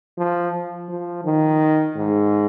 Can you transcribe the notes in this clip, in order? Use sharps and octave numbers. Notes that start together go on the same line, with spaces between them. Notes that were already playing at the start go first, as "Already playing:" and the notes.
F3
F3
D#3
G#2